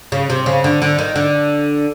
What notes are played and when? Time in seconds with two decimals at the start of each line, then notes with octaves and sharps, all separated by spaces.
0.12 C#3
0.30 C3
0.46 C#3
0.64 D3
0.82 D3
0.98 D#3
1.16 D3